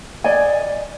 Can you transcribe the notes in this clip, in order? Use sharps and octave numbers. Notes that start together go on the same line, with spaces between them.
D5 D#5 G#5